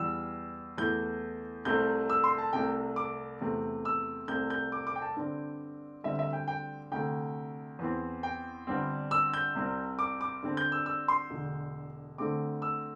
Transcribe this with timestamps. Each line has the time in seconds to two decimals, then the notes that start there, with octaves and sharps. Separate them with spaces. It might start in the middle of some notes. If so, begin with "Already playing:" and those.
Already playing: E2 E3 G3 E6
0.78 E2 E3 A3 G6
1.65 C2 C3 A3 C4 G6
2.09 E6
2.24 C6
2.38 A5
2.53 C2 C3 A3 G5
2.96 D6
3.41 E2 C3 A3 C4
3.85 E6
4.28 C2 C3 A3 C4 G6
4.50 G6
4.72 D6
4.87 D6
4.96 G5
5.02 A5
5.16 G2 D3 C4
6.04 D2 D3 G3 C4 E5
6.19 E5
6.33 G5
6.48 G5
6.92 D2 C3 A3 G5
7.79 E2 E3 C4
8.23 G5
8.67 G1 G2 G3 C4
9.11 E6
9.34 G6
9.55 C2 C3 G3 C4
9.99 D6
10.21 D6
10.43 G2 D3 C4
10.57 G6
10.72 E6
10.86 E6
11.08 C6
11.30 E1 D2 D3
12.18 D2 D3 A3 C4 D6
12.62 E6